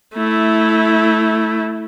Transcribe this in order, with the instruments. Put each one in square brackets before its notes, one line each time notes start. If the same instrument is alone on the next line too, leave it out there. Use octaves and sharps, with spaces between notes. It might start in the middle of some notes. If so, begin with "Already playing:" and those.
[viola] A3 E4